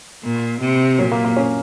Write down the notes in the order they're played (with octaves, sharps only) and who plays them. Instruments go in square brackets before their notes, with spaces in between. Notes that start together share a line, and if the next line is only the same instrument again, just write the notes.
[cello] A#2
C3
[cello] A#2 [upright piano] F#3
[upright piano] A#3
A#3
C#4